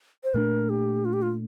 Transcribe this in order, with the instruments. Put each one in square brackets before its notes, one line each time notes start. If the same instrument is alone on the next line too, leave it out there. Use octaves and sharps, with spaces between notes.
[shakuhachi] C5
[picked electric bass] A#2 A3 D4 [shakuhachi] A#4
[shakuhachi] G4
F4
G4
F4